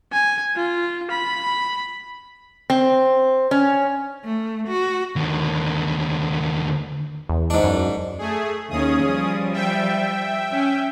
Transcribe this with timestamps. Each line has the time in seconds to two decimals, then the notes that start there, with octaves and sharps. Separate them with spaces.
0.12 G#5
0.56 F4
1.11 B5
2.70 C4
3.51 C#4
4.24 A3
4.68 F#4
5.16 D#2 D3
7.29 E2
7.50 G#2 D4
7.64 F#2
8.19 A3 G#4
8.70 D#2 C#4 G#4 D#6
9.05 F3 G3
9.53 E5 G5
10.52 C#4